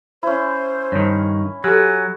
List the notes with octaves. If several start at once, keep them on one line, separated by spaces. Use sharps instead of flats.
C#4 E4 C5
G2 D#3 C#5
F#3 G4 A4 G#5